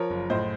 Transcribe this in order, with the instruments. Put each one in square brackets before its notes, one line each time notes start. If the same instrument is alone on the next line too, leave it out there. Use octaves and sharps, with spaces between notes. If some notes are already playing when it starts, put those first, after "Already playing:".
Already playing: [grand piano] F3 A#4 C#5
F#1
A2 C5 D#5